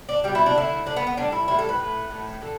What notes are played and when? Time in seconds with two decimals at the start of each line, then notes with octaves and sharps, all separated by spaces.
0.09 D4
0.24 B2 G3 G4
0.35 E4
0.46 D4
0.55 D3 A3 E4
0.86 D3 D4
0.90 A3
0.96 B3
1.07 B3
1.17 A2 G3 D4
1.32 E4
1.48 A2 G3 E4
1.59 A4
1.69 B4
1.79 A2 A3
2.10 A2 A3
2.41 D3 A4